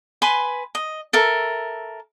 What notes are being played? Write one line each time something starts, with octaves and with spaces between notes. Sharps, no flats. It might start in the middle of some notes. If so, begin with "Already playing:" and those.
B4 G#5 B5 C6
D#5
A4 A#4 E5